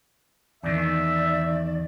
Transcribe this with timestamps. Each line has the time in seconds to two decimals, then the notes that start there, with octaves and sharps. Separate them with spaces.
0.63 E2 D#3 D5 E5